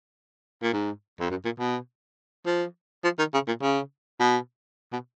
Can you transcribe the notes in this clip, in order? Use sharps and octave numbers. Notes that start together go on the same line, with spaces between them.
A#2
G#2
F2
F#2
A#2
B2
F3
F3
D#3
C#3
A#2
C#3
B2
B2